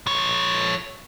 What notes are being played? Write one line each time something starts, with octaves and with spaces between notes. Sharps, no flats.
F3 C#5